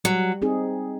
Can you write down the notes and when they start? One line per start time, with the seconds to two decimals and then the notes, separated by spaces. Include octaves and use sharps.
0.04 F#3 G3
0.42 C4 D#4 G#4